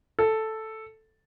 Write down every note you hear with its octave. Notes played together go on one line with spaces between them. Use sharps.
A4